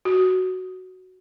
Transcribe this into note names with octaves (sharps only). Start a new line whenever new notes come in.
F#4